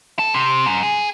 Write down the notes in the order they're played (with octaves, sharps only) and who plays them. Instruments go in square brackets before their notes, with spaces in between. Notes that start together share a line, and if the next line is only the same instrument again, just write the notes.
[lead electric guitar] A4
C3
F#2
G#4